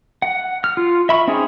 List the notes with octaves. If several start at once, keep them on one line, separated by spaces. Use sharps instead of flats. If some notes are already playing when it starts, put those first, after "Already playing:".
F#5
F6
F4
E5 B5 C#6
C4 C#4 D#4 G#4